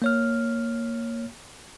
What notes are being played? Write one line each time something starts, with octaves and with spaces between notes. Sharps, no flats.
A#3 C#5 F6